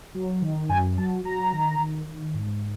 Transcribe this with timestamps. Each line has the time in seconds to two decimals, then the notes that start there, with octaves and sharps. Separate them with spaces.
0.15 F#3
0.42 D#3
0.69 F#2 G#5
0.98 F#3 A5
1.24 F#3 A#5
1.53 D#3
1.79 D#3
2.07 D#3
2.34 G#2